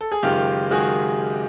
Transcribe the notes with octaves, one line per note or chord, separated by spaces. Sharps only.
A4
G#4
F#1 F#2 D#3 G#3 F4 G4
D#3 G#3 F#4 G#4